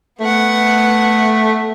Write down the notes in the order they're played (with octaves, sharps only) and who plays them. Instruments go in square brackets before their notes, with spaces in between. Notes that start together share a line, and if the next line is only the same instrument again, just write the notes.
[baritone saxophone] A3 [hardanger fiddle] B3 F#5